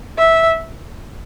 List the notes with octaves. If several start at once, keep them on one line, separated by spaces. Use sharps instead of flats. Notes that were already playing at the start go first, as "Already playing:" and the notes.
E5